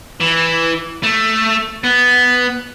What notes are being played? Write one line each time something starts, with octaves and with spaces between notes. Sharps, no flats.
E3
A3
B3